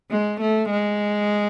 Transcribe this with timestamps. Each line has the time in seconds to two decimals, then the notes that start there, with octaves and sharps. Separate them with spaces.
0.11 G#3
0.41 A3
0.71 G#3